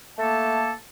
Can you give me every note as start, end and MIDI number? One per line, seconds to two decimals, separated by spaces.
0.18 0.71 57
0.18 0.71 58
0.18 0.71 69
0.18 0.71 81